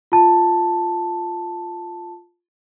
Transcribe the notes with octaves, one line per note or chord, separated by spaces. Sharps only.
F4 A5